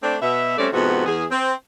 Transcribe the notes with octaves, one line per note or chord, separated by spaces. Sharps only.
A3 C4 D4
B2 E5
G3 A3 C4 C#4 D5
F2 G#2 C3 B3 F#4
E2 G#4
C4